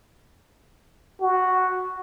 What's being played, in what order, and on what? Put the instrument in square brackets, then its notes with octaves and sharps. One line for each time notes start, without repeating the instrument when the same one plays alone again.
[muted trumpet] F#4